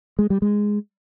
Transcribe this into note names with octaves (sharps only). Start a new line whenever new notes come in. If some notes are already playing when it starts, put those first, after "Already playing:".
G#3
G3
G#3